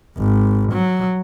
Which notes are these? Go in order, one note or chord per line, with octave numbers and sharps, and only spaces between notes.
G#1
F#3